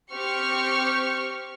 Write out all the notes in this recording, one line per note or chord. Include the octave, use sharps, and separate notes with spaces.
C4 G4 C#6 F6 C#7